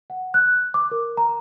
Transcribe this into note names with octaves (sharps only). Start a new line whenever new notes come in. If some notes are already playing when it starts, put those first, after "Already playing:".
F#5
F#6
D6
A#4
A#5